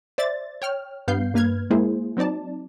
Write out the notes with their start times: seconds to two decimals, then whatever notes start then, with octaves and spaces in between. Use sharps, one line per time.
0.18 C5 D5 E5 A6
0.62 C#5 G5 F6
1.08 G2 B3 F5 G6 C7
1.34 G2 A#3 B4 F6 G#6
1.70 G#3 A#3 E4 G#4 C5
2.17 F#3 C4 D#4 D5 A5